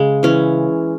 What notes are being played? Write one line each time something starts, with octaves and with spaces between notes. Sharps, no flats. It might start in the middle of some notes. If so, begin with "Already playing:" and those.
Already playing: C#3 G#3
E3 C#4